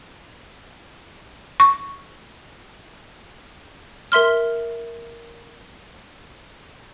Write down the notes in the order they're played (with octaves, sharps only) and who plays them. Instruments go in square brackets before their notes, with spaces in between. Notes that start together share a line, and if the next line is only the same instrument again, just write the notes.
[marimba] C#6
[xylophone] A#4 E5 C6 F6